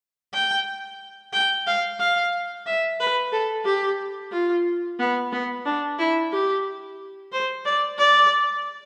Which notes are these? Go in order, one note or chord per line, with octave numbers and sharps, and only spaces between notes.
G5
G5
F5
F5
E5
B4
A4
G4
F4
B3
B3
D4
E4
G4
C5
D5
D5